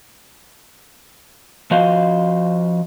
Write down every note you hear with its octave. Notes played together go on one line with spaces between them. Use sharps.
F3 F#4 D#5 F5